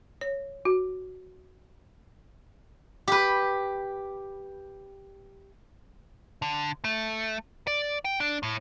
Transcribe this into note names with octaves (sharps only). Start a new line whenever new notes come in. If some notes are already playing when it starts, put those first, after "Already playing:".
C#5
F#4
G4 B4
D3
A3
D5
G5
D4
A2